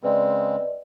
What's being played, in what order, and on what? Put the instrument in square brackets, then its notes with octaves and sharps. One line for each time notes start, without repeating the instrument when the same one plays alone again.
[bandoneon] C#3 G#3 C4 [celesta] B4 D5 D#5